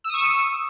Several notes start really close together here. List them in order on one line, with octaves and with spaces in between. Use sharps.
E6 D#6 C#6